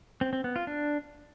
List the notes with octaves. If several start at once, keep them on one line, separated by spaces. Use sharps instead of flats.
C4
C4
B3
F4
D4